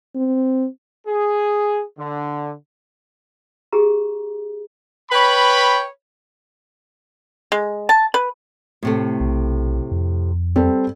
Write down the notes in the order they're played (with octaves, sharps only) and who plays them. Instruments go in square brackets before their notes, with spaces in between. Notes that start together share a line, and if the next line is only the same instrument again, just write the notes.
[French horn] C4
[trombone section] G#4
D3
[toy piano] G4 G#4 A#5
[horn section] B4 C#5 G5 B5
[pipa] G#3
A5
B4
[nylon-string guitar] A2 C3 A3
[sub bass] B1
F2
[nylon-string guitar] G3 [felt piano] C4 A4